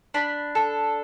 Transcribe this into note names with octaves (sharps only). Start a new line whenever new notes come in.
D4 B5
A4